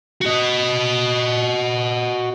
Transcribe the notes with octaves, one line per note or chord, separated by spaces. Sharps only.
F#4 D#5